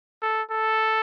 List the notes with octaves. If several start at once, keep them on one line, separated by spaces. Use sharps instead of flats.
A4
A4